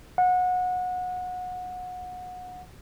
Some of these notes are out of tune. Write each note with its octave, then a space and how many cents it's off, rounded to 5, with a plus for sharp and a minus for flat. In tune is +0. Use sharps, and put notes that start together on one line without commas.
F#5 -25